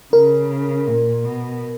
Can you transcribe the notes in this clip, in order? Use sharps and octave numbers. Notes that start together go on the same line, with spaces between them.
C#3 A#4
A#2
B2